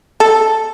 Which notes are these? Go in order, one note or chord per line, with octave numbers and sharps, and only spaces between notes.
A4